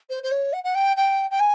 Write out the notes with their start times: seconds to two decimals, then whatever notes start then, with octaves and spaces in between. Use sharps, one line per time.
0.09 C5
0.23 C5
0.31 C#5
0.53 F#5
0.64 F#5
0.75 G5
0.96 G5
1.30 G5
1.39 G#5